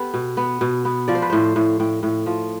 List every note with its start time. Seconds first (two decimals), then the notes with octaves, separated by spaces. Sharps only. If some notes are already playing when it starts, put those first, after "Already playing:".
Already playing: B3 G4 A4
0.14 B2
0.37 B3
0.61 B2
0.85 B3
1.08 F3 D5
1.15 C5
1.22 B4
1.30 A2 C5
1.56 A2
1.80 A2 G5
2.03 A2
2.26 F3